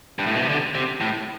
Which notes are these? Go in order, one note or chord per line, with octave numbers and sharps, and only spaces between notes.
G2
A2
B2
C3
D3
C3
A2